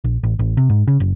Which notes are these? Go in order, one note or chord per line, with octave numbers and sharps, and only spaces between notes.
A#1
A1
A1
C3
G#2
C#3
F#1